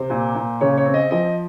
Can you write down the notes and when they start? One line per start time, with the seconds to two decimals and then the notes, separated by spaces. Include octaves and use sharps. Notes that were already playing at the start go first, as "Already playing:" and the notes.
Already playing: C3 C5
0.10 A#2
0.35 A#2
0.61 C#3 C#5
0.77 C#5
0.85 C4
0.94 D#5
1.11 F3 D#5